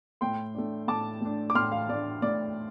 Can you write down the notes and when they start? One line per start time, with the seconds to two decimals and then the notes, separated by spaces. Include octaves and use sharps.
0.21 A2 G5 C6
0.54 A3 D4
0.88 A2 A5 D6
1.21 A3 D4
1.50 D6
1.55 A2 C6 F6
1.72 F5
1.89 A3 D5
1.93 D4
2.22 A2 D5